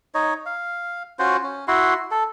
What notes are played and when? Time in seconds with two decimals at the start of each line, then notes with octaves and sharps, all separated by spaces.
0.15 D#4 C#5 D#5
0.46 F5
1.19 C#4 F4 F#4 C5
1.43 C#4
1.68 E4 F#4 C6
2.11 A4